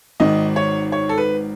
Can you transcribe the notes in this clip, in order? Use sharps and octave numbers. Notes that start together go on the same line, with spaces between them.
G#1 G#2 D#3 D#5
C#5
C#5
A4
B4